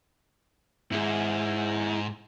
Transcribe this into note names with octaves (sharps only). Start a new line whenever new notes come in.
G#2 E4 G#4